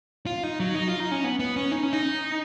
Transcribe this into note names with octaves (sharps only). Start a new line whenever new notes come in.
F4
D#4
F#3
D#4
F4
D#4
C#4
B3
B3
C#4
D#4
C#4
D#4